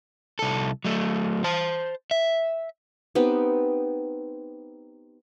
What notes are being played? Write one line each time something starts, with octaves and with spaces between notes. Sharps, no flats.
C2 A4
F#3 A3
C5 A5
E5
B3 C4 D#4 G4